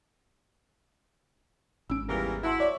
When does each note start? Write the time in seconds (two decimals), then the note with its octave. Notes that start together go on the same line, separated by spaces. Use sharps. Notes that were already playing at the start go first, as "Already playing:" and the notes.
1.90 G#1 C#4 E6 D7
2.09 E2 E3 G3 F4 A#4 G7
2.43 E4 F#4 A5 C6
2.60 C#5 D5 E5 C#6